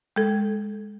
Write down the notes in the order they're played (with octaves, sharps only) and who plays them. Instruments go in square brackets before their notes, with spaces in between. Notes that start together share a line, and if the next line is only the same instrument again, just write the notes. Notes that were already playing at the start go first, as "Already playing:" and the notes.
[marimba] G#3 A4